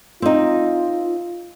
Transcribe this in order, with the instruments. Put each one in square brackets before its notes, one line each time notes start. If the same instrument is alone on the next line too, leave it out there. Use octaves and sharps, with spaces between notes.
[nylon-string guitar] C4 D#4 [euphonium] F4